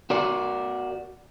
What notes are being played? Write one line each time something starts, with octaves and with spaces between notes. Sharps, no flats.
F#4 A#4 D5